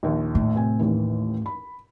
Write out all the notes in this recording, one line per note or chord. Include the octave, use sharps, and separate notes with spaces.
A#1 D#2
A2
C3 C4 G#5
A1 D#2 E3
B5